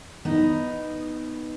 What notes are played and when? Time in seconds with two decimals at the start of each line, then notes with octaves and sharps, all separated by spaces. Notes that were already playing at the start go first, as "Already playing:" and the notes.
0.25 B3 D#4